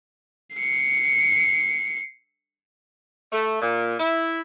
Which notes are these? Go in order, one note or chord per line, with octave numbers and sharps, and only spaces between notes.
C7 C#7
A3
A#2
E4